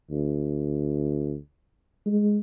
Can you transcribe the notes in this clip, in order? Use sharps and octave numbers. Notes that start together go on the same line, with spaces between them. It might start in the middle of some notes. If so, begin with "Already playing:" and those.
D2
G#3